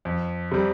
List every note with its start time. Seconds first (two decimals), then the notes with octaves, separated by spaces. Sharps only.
0.05 F2
0.51 C3 G3